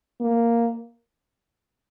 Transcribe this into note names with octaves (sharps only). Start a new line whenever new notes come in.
A#3